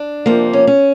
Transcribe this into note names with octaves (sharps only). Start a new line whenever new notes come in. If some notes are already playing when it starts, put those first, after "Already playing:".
Already playing: D4
C3 F3 A#3
C#4
C#4